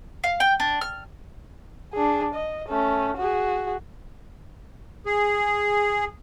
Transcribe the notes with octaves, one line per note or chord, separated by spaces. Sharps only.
F5
G5
D4
F6
D4 G#4
D#5
A3 C#4
F#4 G#4
G#4